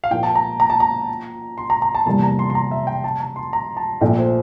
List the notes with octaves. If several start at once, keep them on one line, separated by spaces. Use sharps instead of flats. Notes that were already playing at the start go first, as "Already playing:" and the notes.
F5
A#2 F3 A#3 G5
A5
A#5
A#5
A5
A#5
C6
A#5
A#5
A5
F1 E2 C3 G3 A#3 A5
A#5
C6
C6
A#5
E5
G5
A5
A#5
C6
A#5
A5
A#1 A#2 A3 G5
C5